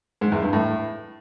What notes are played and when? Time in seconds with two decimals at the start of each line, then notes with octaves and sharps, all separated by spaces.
0.21 G#2
0.32 E2
0.42 G2
0.53 A2